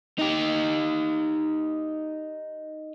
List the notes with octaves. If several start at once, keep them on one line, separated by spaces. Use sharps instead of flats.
D#4 G4